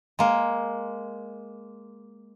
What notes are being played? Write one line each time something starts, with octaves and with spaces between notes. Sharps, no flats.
G#3 A#3